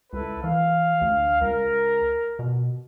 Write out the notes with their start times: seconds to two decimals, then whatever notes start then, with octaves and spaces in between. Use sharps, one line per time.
0.13 C#2 E4 A4 B4
0.44 E3 F5
1.01 D2
1.41 C#2 A#4
2.39 B2